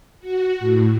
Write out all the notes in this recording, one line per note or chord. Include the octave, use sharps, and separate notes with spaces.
F#4
A2